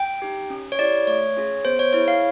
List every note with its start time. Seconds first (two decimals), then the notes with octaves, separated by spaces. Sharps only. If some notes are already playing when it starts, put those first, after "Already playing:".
Already playing: G5
0.22 D#4 G4
0.50 C#4
0.72 C#5
0.79 E4 G4 D5
1.07 A3 C#5
1.36 C#4 F4 G#4
1.65 B3 C5
1.79 C#5
1.93 E4 G#4 C#5
2.08 F5